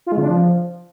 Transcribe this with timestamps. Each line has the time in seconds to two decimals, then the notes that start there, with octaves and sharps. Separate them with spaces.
0.07 F4
0.12 G#3
0.17 C#3
0.23 D4
0.28 F3